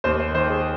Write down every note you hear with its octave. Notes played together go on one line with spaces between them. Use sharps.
D#2 C5
C5
D#3 C5
G#4